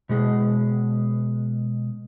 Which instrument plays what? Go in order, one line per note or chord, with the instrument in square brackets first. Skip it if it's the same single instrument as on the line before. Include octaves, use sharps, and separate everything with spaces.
[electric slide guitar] B2 G#3 G#4